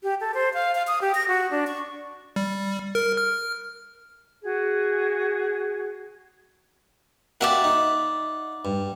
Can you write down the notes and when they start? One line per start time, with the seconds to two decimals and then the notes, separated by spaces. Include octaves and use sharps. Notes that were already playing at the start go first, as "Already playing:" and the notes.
0.03 G4
0.21 A4
0.34 C5
0.54 F5
0.75 F5
0.87 D#6
1.01 G4
1.15 A#6
1.28 F#4
1.51 D4
1.67 C#6
2.36 G3
2.95 A#4
3.17 F6
4.42 F#4 G#4
7.41 A#3 F#4 G4 D5 E5 F#5
7.64 D#4
8.65 G2